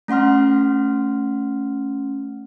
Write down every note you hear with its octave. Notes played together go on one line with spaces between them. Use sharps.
A3 C#4 F#5 C6 F6